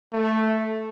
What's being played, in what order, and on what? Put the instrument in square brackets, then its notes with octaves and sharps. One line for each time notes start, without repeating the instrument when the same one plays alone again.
[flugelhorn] A3